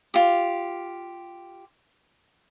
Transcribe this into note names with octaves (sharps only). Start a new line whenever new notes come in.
F4 G4